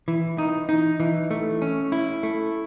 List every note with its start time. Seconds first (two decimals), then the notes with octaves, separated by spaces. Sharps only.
0.08 E3
0.38 D#4
0.69 D#4
1.00 E3
1.31 A3
1.62 C#4
1.92 E4
2.23 A3